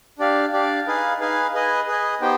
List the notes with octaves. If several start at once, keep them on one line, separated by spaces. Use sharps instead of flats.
D4 G4 D5 F5
D4 G4 D5 F5
D#4 G#4 B4 F5 G#5
D#4 G#4 B4 F5 G#5
G#4 B4 D#5 G#5
G#4 B4 D#5 G#5
B3 D#4 G4 C5 G5